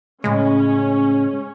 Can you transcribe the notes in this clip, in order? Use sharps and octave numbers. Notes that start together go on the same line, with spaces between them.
A2 C#3 G#3 C#4